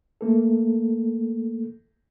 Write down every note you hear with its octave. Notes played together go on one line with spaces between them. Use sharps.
A3 A#3 A4